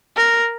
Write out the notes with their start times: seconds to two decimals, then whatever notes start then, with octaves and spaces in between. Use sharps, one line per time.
0.16 A#4